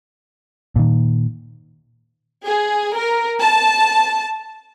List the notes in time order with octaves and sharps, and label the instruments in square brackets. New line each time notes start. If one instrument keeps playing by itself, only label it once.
[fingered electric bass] A#2 D#3
[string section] G#4
A#4
A5